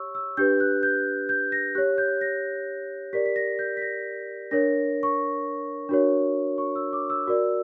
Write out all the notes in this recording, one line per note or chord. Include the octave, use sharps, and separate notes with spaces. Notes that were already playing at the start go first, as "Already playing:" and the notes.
Already playing: G4 C#5 C#6 E6
E6
D4 G4 B4 G6
F#6
G6
G6
A#6
G4 C#5 F#6
G6
A#6
G4 A#4 D5 B6
B6
A#6
G6
B6
A#6
D4 A#4 C#5 A#6
C#6
D4 F#4 A#4 C#5
C#6
E6
D6
E6
F#4 A#4 D5